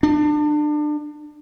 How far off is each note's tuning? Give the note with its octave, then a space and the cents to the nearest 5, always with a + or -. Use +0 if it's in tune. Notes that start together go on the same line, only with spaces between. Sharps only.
D4 +30